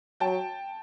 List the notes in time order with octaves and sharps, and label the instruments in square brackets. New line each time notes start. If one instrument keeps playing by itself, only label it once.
[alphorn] F#3 [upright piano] G5 A5